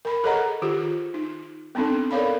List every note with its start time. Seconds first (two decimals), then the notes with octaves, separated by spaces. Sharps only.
0.05 A#4 B5
0.24 G#4 A4 C#5 D#5 F#5 A#5
0.62 D#3 F4 G4 G#4
1.14 D#4
1.75 B3 C4 D4 D#4 A4
2.11 A4 A#4 C#5 D5 F5 B5